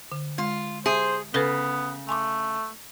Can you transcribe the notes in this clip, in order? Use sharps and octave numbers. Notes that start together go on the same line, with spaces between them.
D3
G#3 F4
G#4 C5 E5
C#3 B3 A4 B4
A3 G#5 C6 D6